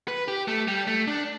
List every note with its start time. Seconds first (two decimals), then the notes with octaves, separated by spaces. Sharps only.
0.08 B4
0.28 G4
0.48 A3
0.68 G3
0.87 A3
1.07 D4